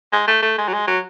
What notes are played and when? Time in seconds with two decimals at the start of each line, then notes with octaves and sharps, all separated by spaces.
0.12 G#3
0.27 A3
0.42 A3
0.58 G#3
0.68 F#3
0.74 G#3
0.88 F#3